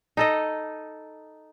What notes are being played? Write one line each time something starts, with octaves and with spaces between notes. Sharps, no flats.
D#4 A4 D#5